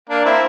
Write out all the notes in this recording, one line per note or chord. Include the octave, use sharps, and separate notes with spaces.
A#3 D4
C4 E4